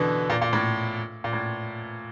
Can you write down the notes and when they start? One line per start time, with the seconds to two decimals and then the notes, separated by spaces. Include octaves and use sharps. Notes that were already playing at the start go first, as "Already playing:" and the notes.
Already playing: B2 D3 E3
0.30 A#2
0.42 A#2
0.53 A2
1.24 A#2
1.33 A2